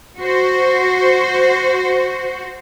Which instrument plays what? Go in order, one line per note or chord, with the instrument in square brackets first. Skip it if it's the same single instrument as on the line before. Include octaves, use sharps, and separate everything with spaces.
[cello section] F#4 C5